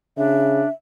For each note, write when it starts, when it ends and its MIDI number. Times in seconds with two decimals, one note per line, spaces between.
0.17 0.64 49
0.17 0.68 62
0.17 0.71 76